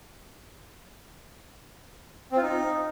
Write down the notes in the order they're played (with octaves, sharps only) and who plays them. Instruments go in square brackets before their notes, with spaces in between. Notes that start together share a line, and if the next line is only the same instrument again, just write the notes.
[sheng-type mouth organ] C4
F4
D#4